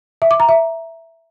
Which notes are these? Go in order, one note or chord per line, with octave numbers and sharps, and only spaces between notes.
E5
D6
A#5
E5